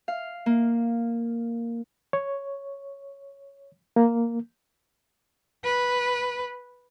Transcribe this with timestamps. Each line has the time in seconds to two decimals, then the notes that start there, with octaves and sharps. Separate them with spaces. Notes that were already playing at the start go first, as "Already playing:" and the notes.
0.08 F5
0.46 A#3
2.13 C#5
3.96 A#3
5.65 B4